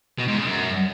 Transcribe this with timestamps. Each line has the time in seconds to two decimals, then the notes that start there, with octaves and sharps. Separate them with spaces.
0.18 B2
0.27 G#2
0.36 C#3
0.45 F#2